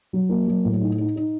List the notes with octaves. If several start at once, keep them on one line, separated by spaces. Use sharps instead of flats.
F#3
A#3
F#3
A2
D#4
D#4
D#4